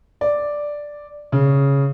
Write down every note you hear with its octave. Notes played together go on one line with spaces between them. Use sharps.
D5
C#3